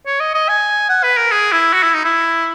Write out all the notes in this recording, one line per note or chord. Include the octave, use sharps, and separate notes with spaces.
C#5
D#5
D#5
G#5
F#5
B4
A#4
G#4
E4
F#4
E4
D#4
E4